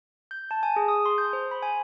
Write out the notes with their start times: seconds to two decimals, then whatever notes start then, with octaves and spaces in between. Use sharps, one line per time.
0.31 G6
0.51 A5
0.63 G#5
0.76 G#4
0.88 D#6
1.06 C6
1.18 G6
1.33 C5
1.51 B5
1.63 G#5